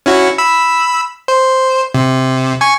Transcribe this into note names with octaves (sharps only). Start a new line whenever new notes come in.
C#4 E4 F#4
B5 E6
C5
C3
G#5 C#6